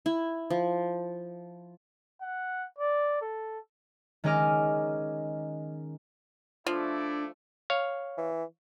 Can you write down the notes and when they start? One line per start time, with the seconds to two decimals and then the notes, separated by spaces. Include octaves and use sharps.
0.06 E4
0.50 F3
2.21 F#5
2.78 D5
3.22 A4
4.24 D#3 G#3 C#4 D#5 D6 F6
6.67 F3 A3 D4 E4 D5
7.70 C#5 F5
8.17 E3